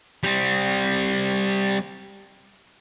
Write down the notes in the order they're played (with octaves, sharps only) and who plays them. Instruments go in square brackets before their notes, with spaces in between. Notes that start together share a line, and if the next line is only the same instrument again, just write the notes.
[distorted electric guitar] G3 C4